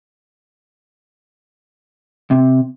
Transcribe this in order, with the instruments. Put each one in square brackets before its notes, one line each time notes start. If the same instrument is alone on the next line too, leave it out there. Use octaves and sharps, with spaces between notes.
[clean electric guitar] C3